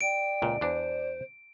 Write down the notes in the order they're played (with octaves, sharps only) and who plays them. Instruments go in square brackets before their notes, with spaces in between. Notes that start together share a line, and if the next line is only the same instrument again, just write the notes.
[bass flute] D5 [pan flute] G5 [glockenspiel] D7
[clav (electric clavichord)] C#2 A#2
[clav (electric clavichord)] E2 D4 [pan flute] C5